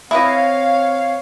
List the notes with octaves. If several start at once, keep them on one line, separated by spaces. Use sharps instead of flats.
C4 E4 B4 C#5 D#5 F5